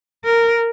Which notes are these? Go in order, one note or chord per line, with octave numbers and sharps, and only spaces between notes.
A#4